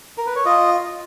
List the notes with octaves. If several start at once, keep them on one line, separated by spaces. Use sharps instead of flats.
A#4
B4
C#5
F4 D#5